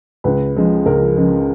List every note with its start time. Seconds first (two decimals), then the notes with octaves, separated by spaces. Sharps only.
0.24 C#2 B4
0.56 C#3 F3 G#3
0.86 C#2 A#4
1.17 C#3 F3 G#3